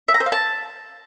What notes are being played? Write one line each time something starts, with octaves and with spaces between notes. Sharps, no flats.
E5
A#5
C5
F5
A5